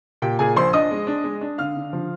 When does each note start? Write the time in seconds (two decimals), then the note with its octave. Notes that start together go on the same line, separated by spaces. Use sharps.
0.22 A#2 G4 G5
0.39 A#2 G#4 G#5
0.56 A#1 C5 C6
0.73 D4 D#5 D#6
0.91 G#3
1.07 D4
1.24 G#3
1.41 D4
1.58 D3 F5 F6
1.76 D3
1.93 F3